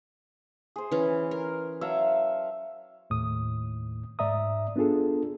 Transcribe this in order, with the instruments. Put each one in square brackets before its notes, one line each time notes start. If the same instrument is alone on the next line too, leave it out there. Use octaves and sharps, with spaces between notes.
[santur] G#4 C5
[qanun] E3 C#4
A#4
[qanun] F#3 [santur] E5 F5 A5
[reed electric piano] D#2 A2 D#6
G#2 D5 E5 A#5 D#6
B3 D4 F4 G#4 A4